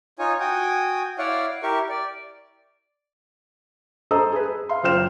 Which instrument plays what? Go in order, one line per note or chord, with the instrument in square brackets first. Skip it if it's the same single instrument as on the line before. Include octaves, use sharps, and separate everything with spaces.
[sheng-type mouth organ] D#4 F4 C#5 G#5
F#4 G5 G#5 D#6
E4 C#5 D5 F5 F#5
E4 G4 A#4 C#6
D5
[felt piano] A4 C5 D#5 A#5 D#6 E6
G#4 B4
G#4
F5 C6
F#1 F4 C5 G5 F6 E7